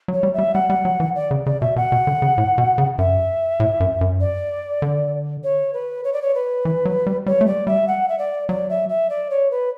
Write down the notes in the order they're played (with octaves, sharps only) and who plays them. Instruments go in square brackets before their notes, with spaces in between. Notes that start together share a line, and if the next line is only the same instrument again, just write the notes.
[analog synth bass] F#3
[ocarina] C#5
[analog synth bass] G3
[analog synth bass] G3 [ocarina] E5
[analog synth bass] G3 [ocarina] F#5
[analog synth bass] G3
F#3
E3
[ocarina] D5
[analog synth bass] C#3
[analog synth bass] C#3 [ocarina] D5
[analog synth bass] B2 [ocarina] E5
[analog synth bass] B2 [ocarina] F#5
[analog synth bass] B2
D3
C#3
A2
B2
C#3
[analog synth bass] F#2 [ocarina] E5
[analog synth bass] A2
F#2
F#2
[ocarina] D5
[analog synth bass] D3
[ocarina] C#5
B4
C#5
D5
C#5
B4
[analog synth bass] E3
F#3
G3
[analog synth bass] G3 [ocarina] C#5
[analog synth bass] A3
[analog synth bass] G3 [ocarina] D5
[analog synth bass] G3 [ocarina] E5
[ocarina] F#5
E5
D5
[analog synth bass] F#3 [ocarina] D5
[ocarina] E5
E5
D5
C#5
B4